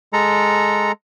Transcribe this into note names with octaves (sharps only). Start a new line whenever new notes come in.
G#3 A4 A#5